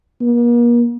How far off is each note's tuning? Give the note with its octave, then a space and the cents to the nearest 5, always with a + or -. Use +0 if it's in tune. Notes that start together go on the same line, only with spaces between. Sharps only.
A#3 +40